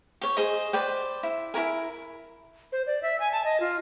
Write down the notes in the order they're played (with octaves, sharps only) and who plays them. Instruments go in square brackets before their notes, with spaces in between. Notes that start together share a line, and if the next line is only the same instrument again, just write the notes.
[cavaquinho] G4 C#5
G#4 C5 D#5
B4 C5 D5 G5
E4
E4 G4 A#4 G#5
[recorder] C5
D5
E5
G#5
A5
D#5
F4